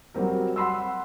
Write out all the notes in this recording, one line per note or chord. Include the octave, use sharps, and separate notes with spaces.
F#3 G3 C4 A#4
F#5 B5 C6 E6